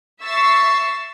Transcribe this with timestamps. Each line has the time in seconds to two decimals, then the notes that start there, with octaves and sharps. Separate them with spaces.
0.22 E5 C#6 E6 A6 C7